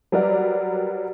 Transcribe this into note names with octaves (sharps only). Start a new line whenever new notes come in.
F#3 G3 A#4 B4 D5 F#5